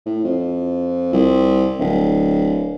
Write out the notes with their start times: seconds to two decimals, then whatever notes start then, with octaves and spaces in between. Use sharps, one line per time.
0.06 A2
0.24 F2
1.13 C2
1.79 D1